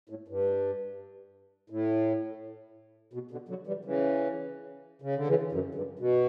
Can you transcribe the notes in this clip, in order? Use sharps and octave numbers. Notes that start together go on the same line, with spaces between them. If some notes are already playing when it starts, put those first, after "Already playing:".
A2
G2
A2
B2
B2 D3
D3 F#3
E3 G3
C#3 E3
C#3
D3
C#3 E3
F#2
G2
B2